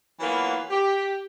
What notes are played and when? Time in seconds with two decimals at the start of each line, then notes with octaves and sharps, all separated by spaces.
0.20 E3 F#3 A#3 B3 F4 F#4
0.69 G4